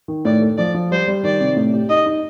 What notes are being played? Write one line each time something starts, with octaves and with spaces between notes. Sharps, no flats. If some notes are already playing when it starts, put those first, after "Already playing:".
D#3
A2 D5
A3
F3 D5
F3
G3 C5
G3
D#3 D5
C3
A2
G4
D#4 D#5
D#4